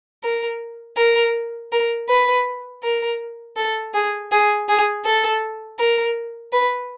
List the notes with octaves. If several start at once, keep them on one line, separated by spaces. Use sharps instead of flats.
A#4
A#4
A#4
B4
A#4
A4
G#4
G#4
G#4
A4
A#4
B4